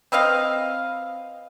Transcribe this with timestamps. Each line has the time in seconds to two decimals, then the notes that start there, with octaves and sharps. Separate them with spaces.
0.12 C4 B4 D#5 F5